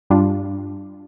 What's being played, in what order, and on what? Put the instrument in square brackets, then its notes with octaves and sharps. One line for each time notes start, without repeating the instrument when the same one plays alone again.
[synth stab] G2 G3 D4 F4